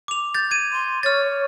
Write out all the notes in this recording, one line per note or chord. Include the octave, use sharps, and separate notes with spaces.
D6 F7
G6 A6
G#6 D#7
C6
C#5 F6 A6